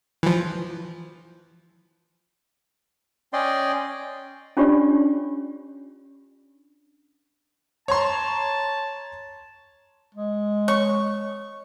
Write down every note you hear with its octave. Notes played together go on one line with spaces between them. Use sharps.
E3 F3
C#4 D5 D#5 G5 C6
C#4 D4 F4 G4 C#5 D5
C#5 A5 A#5 C6
G#3
C#5 C#6